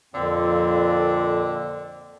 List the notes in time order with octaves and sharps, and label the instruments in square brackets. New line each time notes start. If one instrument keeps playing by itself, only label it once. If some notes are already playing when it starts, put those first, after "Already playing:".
[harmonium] F2 C4 [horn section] A#2 D3